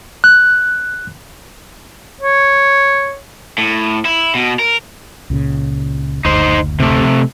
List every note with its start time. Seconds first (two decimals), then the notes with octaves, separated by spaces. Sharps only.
0.24 F#6
2.21 C#5
3.58 A2
4.05 E4
4.35 B2
4.59 A#4
5.30 C#2 A#2 C#3
6.25 F#1 D2 D#4 C5
6.80 C3 A3